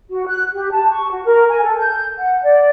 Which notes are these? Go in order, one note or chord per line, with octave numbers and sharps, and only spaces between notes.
F#4
F#6
G4
A5
C#6
F#4
A#4
G#5
A4
G6
F#5
D5